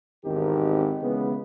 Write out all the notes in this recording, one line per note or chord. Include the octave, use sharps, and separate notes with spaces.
G#1 E2 D#3 C4 D#4 G4
C#3 E3 G#3 B3